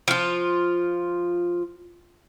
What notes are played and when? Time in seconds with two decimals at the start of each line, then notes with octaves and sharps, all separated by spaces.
0.08 F3 F4